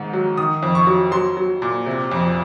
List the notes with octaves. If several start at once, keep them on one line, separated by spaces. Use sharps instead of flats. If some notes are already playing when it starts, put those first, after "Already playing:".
Already playing: G#2 D#3
F#3
D#3 D#6
F2
C#6
F#3
F#3 C6
F#3
A#2
C3
F2